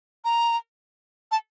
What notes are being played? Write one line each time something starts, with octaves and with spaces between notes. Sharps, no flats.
A#5
A5